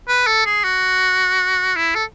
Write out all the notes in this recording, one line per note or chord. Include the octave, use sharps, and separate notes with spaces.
B4
A4
G#4
F#4
E4
A4